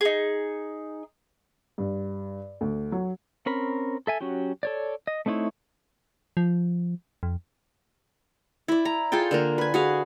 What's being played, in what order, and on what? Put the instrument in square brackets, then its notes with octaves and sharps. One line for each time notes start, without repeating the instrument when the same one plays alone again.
[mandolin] D#4 G#4
[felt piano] G2
D2
F#3
[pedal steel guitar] C4 C#4 A#4 B5
A4 E5 G#5
F#3 C#4 F#4 G4
A4 C#5 D5
D#5
A3 C4 D#4 E4 C#5
[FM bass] F3
F2
[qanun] E4 D5
A#5
F4 G#4 A4 G5
D3 A#3 A#4
B4 G#5
F#4 G#4 F5